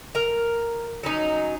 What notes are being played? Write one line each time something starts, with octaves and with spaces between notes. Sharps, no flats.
A#4 A#5
F#3 C#4 D#4